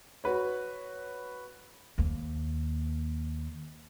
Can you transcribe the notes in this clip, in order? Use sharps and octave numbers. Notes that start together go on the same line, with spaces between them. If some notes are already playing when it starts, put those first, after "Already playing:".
F#4 B4 C#5
D#2 A#3